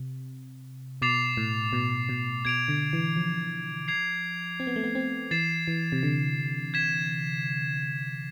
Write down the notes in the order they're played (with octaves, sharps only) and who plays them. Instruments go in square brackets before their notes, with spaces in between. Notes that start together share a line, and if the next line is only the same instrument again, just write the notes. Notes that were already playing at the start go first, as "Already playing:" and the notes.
Already playing: [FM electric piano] C3
[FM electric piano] B2 [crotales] D6 A6 C7 F7
[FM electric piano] A2
B2
B2
[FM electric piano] B2 [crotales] G#6 D7 F7
[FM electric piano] D3
E3
F3
[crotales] G#6 C7 F7
[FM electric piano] C4
B3
A3
B3
C4
[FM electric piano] E3 [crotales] A6 C7 E7
[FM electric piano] E3
C3
D3
[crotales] G#6 B6 E7